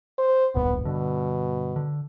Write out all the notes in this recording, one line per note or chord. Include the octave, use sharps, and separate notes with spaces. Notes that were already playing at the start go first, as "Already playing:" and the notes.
C5
D1 A#1 G2 B3
G2 B2 D3
D3